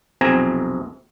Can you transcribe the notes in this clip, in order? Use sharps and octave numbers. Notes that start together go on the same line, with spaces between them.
B1 F2 C3 C4 G#5 A#5